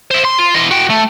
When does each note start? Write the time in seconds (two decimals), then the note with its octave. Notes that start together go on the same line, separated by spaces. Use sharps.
0.11 E4 C5
0.25 C6
0.39 F4
0.55 E3 D#5
0.71 F#4 G5
0.90 A3